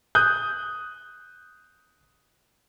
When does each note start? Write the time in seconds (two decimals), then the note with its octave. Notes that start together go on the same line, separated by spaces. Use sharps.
0.15 D#6 F#6 G6